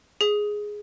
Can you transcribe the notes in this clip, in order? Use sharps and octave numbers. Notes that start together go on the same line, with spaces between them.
G#4